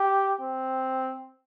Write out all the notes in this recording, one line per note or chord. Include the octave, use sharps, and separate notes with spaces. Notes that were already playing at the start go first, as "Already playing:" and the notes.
Already playing: G4
C4